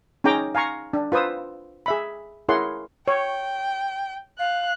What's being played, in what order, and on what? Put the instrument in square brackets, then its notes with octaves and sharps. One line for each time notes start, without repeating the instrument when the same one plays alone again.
[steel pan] C#4 D#4 G#4 G5 A#5 D6
F5 G#5 A#5 C#6
D4
F4 B4 C5 D#6 E6
G#4 E5 B5
E4 G#4 A#4 C#5 F#5 C6
[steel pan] C#5 [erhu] G5
[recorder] F5 [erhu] F#6